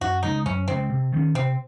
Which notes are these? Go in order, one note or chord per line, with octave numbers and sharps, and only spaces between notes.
F#2 F#4
C#3 G#3 D#4
F#2 C#4
C#3 G#3 C4
C3
D#3 A#3 C#4
C3 C4